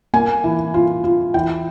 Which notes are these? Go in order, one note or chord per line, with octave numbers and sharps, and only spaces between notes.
A#3 G#5
E3
F4
F4
E3 G5